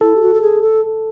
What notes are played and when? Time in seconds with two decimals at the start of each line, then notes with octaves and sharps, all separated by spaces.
0.01 E4 A4
0.16 G4
0.21 F#4
0.34 A4
0.41 G#4
0.62 A4